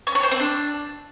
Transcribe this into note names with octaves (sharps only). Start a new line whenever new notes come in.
C#4
C#5
C5
C4
D4